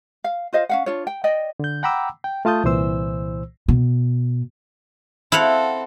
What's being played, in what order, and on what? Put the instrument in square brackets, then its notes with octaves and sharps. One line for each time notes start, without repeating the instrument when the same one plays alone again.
[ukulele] F5
F4 C5 D#5 F5
C#4 F5 F#5
D4 F4 C#5
G5
D5 D#5 G5
[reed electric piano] D3 G6
F#5 G5 A#5 B5 D6 E6
G5
A3 F4 A5 D#6 G6
C2 A#2 E3 C5 E6
[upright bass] B2
[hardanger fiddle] C4 A4 [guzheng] E4 F5 F#5